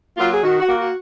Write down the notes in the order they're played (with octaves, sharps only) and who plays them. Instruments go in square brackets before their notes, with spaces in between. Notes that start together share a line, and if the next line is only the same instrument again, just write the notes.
[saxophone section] F#3 A#3 F4
G#4
D#3 F#4
F#4
A#3
F#4